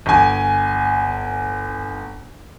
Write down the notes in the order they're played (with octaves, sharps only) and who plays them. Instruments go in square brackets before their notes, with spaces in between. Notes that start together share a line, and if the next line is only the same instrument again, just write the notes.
[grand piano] G1 G#5